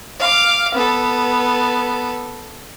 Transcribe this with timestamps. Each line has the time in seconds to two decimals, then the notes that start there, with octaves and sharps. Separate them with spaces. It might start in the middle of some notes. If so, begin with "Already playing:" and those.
0.19 F5 D6
0.75 B3 A4